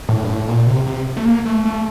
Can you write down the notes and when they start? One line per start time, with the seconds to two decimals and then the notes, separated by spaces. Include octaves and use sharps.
0.09 A2
0.23 G2
0.29 A2
0.48 A#2
0.67 C3
0.87 C3
1.17 A3
1.25 A#3
1.46 A3
1.65 A3